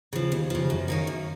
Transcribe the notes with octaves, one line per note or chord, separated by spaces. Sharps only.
C#3 F3
D#2
C#3 F3
F#2
D#3 A#3 C#4
F#2